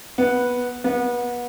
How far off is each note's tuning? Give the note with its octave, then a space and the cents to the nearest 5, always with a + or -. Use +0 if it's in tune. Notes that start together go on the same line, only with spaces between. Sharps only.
B3 -10
B3 -30